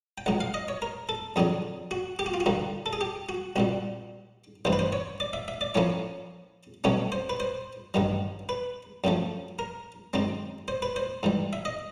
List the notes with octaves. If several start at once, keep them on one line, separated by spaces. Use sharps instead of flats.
G5
C#2 C#3 F#3 F#5
F5
D#5
C#5
A#4
A4
F2 D3 F#3 G#4
F#4
G4
F#4
F4
F#4
D#2 D3 G3 A#3
A4
G#4
G4
F#4
C2 A#2 G3 F#4
A1 G2 E3 C5
B4
C5
C#5
D5
E5
E5
D5
A2 F3 A#3 C#4 E4 C#5
C2 B2 F#3 A3 C#4 C#5
C5
B4
C5
A1 G2 D#3 F#3
B4
F#2 C#3 F3 A3
A#4
F#2 D#3 G#3 C4
C5
B4
C5
G#2 E3 G3
E5
D#5